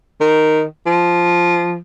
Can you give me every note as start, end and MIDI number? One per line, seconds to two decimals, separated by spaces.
0.21 0.64 51
0.86 1.77 53